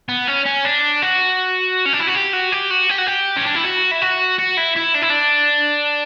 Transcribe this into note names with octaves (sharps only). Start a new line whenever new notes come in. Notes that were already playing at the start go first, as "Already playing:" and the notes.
B3
C#4
C#4
D4
F#4
C#4
D4
E4
F#4
G4
F#4
G4
F#4
G4
F#4
G4
C#4
D4
E4
F#4
E4
F#4
F#4
E4
E4
D4
E4
D4